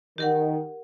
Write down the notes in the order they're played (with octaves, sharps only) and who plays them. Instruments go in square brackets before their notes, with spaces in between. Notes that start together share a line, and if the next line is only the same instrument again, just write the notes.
[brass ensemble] D#3 [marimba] G4 A#4 F#5